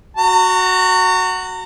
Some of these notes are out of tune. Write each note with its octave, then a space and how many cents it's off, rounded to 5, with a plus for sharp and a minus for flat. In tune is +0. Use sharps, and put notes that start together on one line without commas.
F#4 +0 A#5 -40